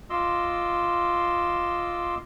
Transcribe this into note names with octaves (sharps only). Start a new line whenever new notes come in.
F4 D#5 C6 D6 E6